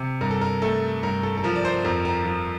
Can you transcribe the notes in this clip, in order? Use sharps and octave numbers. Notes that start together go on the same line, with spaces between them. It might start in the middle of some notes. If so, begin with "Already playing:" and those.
Already playing: C3
G2 A#4
A4
A#4
A3 A4
G2 A#4
A4
A4
F3 A#4
D5
C5
F2 A#4
A#4
F3